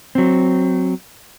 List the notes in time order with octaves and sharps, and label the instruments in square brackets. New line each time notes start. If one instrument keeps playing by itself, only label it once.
[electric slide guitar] F#3 C4